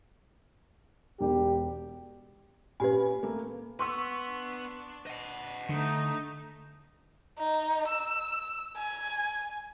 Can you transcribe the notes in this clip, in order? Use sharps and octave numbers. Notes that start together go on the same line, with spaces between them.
E1 G4
A#2 C#4 G4 B4 G#5 B5
A3 A#3
B4 F#5 C6 C#6 E6
D4
D#5 F#5
D3 A3 D#4
D#4
E6
G#5